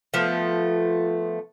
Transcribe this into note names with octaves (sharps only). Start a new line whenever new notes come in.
F3 A3 B3